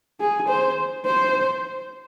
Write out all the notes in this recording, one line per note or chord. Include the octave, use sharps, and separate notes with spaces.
G#4
C5
C5